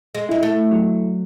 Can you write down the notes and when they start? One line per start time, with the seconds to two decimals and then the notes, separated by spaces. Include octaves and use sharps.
0.15 G#3
0.29 G#3 E4
0.43 A3
0.71 F#3